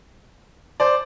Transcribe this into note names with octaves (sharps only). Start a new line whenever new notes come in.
C5 D5